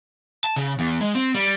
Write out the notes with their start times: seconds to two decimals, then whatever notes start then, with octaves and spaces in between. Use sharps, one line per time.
0.44 A5
0.56 C#3
0.79 E2
1.01 G#3
1.15 C4
1.34 G3